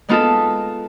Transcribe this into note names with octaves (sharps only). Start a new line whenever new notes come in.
G#3 B3 D#4 F4 A4